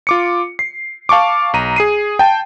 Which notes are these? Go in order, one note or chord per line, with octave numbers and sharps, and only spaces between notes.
F4 D6 C#7
C7
F5 A5 C#6 D6
B1 A#5 D#7
G#4 C7 D#7
G5 A5